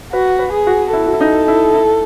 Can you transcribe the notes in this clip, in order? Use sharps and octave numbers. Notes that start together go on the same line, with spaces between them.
F#4 B4
B4
G#4
F#4
E4 A4
F#4
E4
D#4
E4
E4